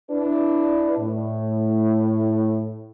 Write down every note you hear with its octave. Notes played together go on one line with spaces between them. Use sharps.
D4 E4 B4
A2